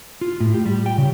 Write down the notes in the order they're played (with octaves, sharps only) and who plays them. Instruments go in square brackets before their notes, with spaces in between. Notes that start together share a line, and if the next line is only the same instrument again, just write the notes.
[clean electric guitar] F4
A2
G4
G3
G5
C#3